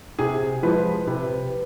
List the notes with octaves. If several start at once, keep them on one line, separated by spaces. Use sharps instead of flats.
C3 G#4
F3 G#3 B4
C3 B4